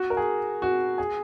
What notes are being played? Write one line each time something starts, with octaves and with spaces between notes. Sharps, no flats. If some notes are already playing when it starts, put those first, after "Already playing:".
Already playing: F#4
A#4
G#4
F#4
G#4